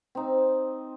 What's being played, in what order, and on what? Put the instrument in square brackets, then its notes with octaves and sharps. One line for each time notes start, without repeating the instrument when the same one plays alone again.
[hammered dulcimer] C4 D#4